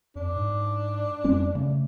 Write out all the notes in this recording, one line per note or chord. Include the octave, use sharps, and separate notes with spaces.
F2 D4
G#2
F2 G3 C4 C#4
C#3 A3